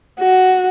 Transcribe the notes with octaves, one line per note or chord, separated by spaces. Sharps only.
F#4